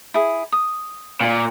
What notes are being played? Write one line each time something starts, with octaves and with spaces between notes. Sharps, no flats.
E4 G#4
D#6
A#2